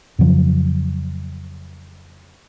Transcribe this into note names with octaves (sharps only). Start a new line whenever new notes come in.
F2 C#3 F3 F#3